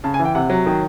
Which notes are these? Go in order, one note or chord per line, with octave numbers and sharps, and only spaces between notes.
C#3 A5
G#5
E3
G5
C3 F#5
F#3
D#3